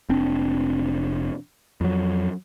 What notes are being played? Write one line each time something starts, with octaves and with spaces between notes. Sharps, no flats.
F1 C4 D4
F2 F#3